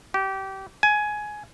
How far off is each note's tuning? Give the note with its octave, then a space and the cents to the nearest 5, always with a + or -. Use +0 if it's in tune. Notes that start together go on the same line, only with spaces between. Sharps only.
G4 -25
G#5 +15